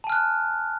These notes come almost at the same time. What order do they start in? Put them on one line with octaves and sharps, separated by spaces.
A5 G#5 F6 F#6